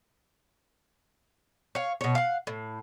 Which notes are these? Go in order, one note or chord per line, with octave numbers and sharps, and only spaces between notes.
C#5 F5
B2 C#5
F5 F#5
A2